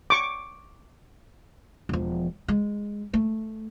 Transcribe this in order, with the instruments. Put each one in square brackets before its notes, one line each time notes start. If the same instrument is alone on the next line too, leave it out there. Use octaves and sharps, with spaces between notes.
[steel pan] C#6 D6
[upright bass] E1 F3
G#3
A3